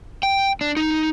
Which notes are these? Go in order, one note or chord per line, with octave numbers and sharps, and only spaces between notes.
G5
D4
D#4